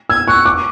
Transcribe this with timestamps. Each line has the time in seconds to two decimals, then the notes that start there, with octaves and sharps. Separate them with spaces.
0.10 E6 G#6
0.28 C#6 F#6
0.46 D6